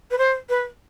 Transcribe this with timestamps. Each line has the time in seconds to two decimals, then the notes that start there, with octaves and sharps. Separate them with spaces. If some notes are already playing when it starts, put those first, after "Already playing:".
0.10 B4
0.18 C5
0.49 B4